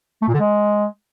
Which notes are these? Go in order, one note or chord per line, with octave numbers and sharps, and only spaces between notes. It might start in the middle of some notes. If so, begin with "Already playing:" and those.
A3
A#2
D3
G#3